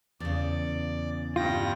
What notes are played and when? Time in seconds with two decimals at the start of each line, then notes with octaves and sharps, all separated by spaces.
0.20 E2 C#3 D5
1.36 G2 F4 G5 A#6